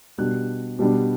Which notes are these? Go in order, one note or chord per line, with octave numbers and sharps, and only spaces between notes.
B2 G3 D4 F#6
B2 G3 D4